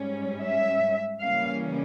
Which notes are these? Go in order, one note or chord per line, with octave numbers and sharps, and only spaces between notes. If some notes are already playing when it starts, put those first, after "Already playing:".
Already playing: G#2 G3 C#4
E5
C#3 E3 G3 A#3 C#4 F5